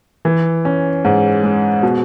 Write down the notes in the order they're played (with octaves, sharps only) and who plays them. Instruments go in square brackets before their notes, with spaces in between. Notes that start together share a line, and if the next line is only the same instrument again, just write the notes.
[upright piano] E3
C#4
G#2
G#3
B2